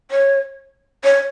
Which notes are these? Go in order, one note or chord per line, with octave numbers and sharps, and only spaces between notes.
C#5
C#5